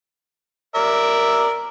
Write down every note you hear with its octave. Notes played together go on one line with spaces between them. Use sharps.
A#4 D5 E5